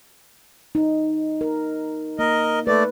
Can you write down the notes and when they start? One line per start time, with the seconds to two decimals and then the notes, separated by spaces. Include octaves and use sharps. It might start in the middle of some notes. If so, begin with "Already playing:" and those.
0.75 D#4
1.41 A#4
2.19 A#3 A#4 D#5
2.67 A3 B4 D5